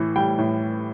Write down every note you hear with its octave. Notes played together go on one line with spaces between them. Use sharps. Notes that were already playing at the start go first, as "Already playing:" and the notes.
Already playing: A2 E3
G3 G5
A2